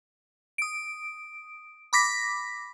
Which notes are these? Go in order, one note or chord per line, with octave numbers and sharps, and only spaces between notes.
D#6 D7
B5 D6 A#6 B6